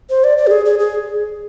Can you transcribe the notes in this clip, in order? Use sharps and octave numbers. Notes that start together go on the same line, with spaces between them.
C5
D5
D5
G4
G#4
G#4
G#4